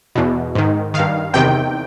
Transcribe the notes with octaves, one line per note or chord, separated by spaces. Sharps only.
E2 B2
G#2 D#3
G2 D#3 F5
E2 C3 D#3 G5